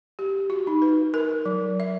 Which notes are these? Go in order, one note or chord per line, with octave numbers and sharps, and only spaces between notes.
G4
F#4
D#4
B4
A#4
F#3
E5